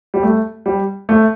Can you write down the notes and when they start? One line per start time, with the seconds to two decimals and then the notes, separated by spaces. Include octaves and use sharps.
0.14 G3
0.23 A3
0.66 G3
1.09 A3